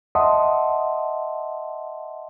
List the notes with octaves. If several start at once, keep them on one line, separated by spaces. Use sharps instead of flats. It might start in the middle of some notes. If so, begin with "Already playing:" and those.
D#5 E5 F#5 A5 C6 D#6